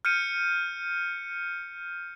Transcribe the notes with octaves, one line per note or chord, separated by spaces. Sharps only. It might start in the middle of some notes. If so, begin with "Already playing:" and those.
F6 G6 C#7 D#7